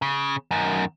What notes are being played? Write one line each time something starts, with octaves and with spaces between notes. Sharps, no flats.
C#3
F#2 D#3